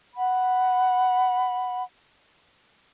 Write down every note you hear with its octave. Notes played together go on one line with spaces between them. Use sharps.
F#5 B5